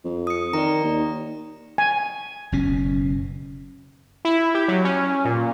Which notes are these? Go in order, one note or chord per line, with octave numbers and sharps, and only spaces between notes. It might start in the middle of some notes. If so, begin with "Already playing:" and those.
F2
D#6 C#7
D#3 D5 A#5
D#2
G#5
F#1 B2 C#4
E4
G4
F#3
C#4
A#2